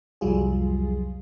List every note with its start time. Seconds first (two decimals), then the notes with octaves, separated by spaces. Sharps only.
0.21 C2 F2 F#3 G3 F4 G#4